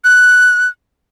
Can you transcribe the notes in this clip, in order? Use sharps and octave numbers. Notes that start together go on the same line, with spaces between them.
F#6